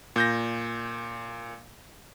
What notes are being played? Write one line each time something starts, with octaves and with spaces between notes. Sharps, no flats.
A#2 G6 A#6